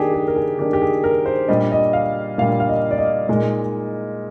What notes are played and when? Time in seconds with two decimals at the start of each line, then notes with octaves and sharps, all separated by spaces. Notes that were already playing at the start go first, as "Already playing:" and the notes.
Already playing: D#3 A#3 D4 G4 G#4
0.14 G#4
0.28 A#4
0.36 G#4
0.59 D#3 A#3 D4 G4
0.73 G4
0.82 G#4
1.04 A#4
1.26 C5
1.48 A#2 G3 D4 D#5
1.72 D#5
1.93 F5
2.38 A#2 G3 D4 F5
2.60 F5
2.69 D#5
2.91 D5
2.98 D#5
3.29 A#2 G#3 D#4